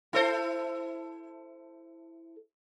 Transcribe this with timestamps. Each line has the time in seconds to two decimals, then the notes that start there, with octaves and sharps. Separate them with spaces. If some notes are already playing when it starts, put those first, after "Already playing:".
0.13 E4 A4 C5